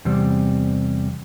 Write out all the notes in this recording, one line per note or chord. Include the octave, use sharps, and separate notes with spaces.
E2 C3 G3 C4